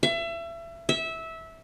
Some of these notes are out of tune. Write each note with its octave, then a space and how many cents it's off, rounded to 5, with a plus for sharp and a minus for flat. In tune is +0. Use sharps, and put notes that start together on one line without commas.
E5 +30
E5 -15